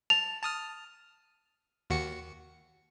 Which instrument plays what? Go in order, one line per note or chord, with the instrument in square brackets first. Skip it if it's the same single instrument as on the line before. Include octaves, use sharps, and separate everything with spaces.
[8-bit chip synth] A5 [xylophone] F7
[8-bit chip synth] A5 D#6 F6
D#2 F#4 C#7